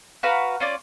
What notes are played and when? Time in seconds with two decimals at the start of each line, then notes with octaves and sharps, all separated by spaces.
0.23 F#4 B4 F5 A#5
0.60 C#4 F4 D5